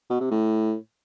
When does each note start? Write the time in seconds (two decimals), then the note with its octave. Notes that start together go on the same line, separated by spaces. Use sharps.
0.10 B2
0.20 C3
0.31 A2